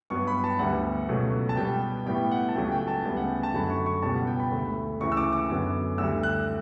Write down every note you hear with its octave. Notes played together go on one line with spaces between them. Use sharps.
G2 F#3 B3 C#6
B5
A5
D2 D3 G3 B3 F#5
C#2 B2 F#3 A3
A5
B2 G3 B3 G5
A2 G3 B3 G5
F#5
A5
C#2 C#3 F#3 A3 G5
G5
A5
D2 C#3 G3 B3
F#5
G5
A5
F#2 D3 F#3 A3 B5
C#6
C#6
C#2 B2 G3 B3 A5
F#5
G5
B5
D2 D3 A3
D2 C#3 E3 C#6
E6
D6
D6
F#2 D3 F#3 B3
D2 D3 G3 E6
F#6